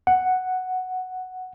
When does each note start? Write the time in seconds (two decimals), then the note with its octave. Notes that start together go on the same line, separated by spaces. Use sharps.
0.07 F#5